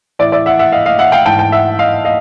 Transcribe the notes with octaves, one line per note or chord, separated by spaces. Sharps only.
A2 E3 D5 E5
D5 E5
E5 F#5
E5 F#5
D#5 F5
D#5 F5
E5 F#5
F5 G5
G#2 E3 G5 A5
G5 A5
E5 F#5
D#5 F5
D#5 F5